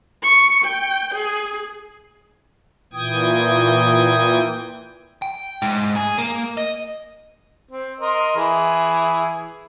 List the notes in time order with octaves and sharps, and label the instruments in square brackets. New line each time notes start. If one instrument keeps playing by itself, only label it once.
[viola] C#6
G5
G#4
[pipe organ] A#2 E3 G5 D#6 G#6
[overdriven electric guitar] G5
G#2
G#4
A#3
D#5
[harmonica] C4
A#4 D#5 C6
E3 E4 G#4